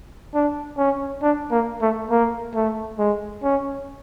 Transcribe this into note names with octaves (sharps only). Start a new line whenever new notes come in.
D4
C#4
D4
A#3
A3
A#3
A3
G#3
C#4